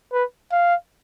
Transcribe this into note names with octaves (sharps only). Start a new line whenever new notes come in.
B4
F5